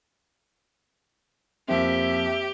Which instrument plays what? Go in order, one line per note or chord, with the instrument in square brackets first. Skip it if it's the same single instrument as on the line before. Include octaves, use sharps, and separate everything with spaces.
[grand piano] F2 A#3 C4 [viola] G4 [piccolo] E5